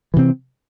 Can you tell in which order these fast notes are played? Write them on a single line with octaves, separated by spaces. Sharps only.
E3 C3 C4